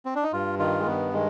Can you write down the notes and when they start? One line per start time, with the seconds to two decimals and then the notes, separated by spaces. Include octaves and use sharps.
0.05 C4
0.15 D4
0.23 D#4
0.33 G2 F4
0.59 D#3 F4
0.79 G#3
0.86 G2 B3
1.13 D#3 G#3